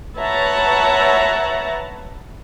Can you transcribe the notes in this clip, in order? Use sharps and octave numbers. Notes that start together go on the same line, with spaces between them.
B4 C#5 E5 F#5 A5 A#5